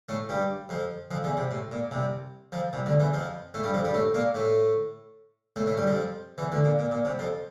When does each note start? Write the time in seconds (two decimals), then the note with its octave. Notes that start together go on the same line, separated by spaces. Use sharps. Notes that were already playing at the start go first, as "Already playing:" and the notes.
0.09 A2 A3
0.29 G2 G3
0.69 F2 F3
1.11 F2 F3
1.24 E2 E3
1.37 C2 C3
1.51 A2
1.72 A#2
1.91 C2 C3
2.52 F2 F3
2.73 C2 C3
2.86 D2 D3
3.00 E2 E3
3.14 F2 F3
3.54 A2 A3
3.63 G2 G3
3.74 F2 F3
3.84 G2 G3
3.94 A2 A3
4.14 A#2 A#3
4.35 A2 A3
5.56 A2 A3
5.66 A2 A3
5.77 G2 G3
5.87 F2 F3
6.38 E2 E3
6.52 D2 D3
6.64 A#2
6.79 A#2
6.92 A#2
7.05 C2 C3
7.19 F2 F3